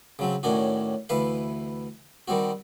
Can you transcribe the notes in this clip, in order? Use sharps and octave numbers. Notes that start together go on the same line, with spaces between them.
C#3 F#3 C4
A2 D#3 C#4 D4 F#4
D2 E3 B4 F5
D#3 G3 C4 F#4